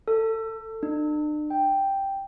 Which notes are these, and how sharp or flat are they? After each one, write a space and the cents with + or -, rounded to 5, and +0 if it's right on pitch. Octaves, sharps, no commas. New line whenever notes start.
A4 +25
D4 +45
G5 +0